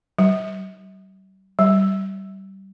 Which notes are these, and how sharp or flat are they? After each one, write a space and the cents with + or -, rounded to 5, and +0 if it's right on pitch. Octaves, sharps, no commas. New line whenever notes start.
G3 -45
G3 -25